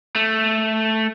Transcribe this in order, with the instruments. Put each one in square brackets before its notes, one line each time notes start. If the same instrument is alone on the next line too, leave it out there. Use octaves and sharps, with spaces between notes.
[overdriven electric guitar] A3